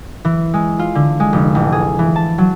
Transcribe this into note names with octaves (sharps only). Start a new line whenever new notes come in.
E3
G#3
F4
D3
G#3
F1
A1
G#4
E3
A5
F#3